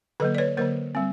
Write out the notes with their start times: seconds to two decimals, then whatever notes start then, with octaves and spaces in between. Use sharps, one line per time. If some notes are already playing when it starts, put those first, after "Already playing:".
0.20 D3 F#3 A#3 A4 B4
0.35 D5
0.38 B4 C#5
0.57 D3 F#3 A#3 A#4 C5
0.95 G3 C4